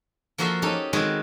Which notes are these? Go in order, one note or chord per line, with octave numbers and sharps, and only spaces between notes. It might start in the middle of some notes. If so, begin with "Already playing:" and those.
F3 A#3 F#4 A4 E5 C6
C#4 D#4 G4 A4
D#3 G#3 C4 F#4 G#4 B4